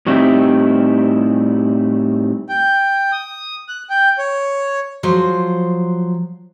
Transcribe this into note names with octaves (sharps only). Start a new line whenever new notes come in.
A2 G3 C4 D#4 E4 G4
G5
D#6
F#6
G5
C#5
F3 F#3 C5